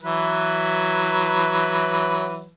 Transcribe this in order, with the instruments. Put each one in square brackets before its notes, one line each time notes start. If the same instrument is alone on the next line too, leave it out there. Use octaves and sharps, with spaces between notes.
[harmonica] E3 F#3 B4